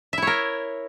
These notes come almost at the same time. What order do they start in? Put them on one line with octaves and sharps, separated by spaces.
E5 E4 C#5 A#4